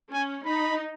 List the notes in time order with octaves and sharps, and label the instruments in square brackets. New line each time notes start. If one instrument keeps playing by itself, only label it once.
[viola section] C#4 [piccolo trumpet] G#5
[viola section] D#4 [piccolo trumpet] B5